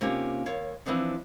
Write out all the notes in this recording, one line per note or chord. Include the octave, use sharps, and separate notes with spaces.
C3 A#3 C#4 D#4 F4 G4
D#2 C#5 F5
E3 F3 C4 D4 D#4